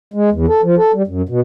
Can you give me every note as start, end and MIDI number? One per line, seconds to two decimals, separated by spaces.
0.14 0.30 56
0.32 0.46 40
0.48 0.61 69
0.63 0.75 53
0.78 0.92 69
0.94 1.02 55
1.07 1.22 42
1.29 1.40 47